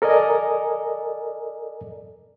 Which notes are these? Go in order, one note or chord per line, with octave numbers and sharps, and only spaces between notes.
A4 A#4 D5 D#5 G#5